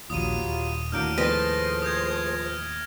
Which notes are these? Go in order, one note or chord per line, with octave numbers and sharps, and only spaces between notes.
A#1 D#2 F#3 G3 F4 D#6 D#7
D#1
D#2 A2 F#3 A#3 D4 F6 G6 D7
F3 A3 G#4 B4 C5 A#6
D#6 G6 G#6
F6